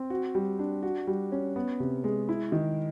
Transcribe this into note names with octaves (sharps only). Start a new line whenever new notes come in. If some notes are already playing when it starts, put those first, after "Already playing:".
Already playing: C4
F#4
G3
D4
F#4
G3
C#4
B3
C3
G#3
E4
D#3